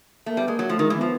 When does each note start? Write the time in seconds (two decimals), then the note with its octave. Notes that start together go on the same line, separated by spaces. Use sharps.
0.26 A3 A#3
0.37 G3 B3
0.48 G#3 A#3
0.59 F#3
0.69 F3 A3
0.79 D#3 G#3
0.90 E3
0.98 F3 B3